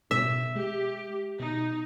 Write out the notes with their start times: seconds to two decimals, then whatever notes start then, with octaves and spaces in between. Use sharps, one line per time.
0.11 B2 E5
0.56 G#3 G4
1.40 B2 D#4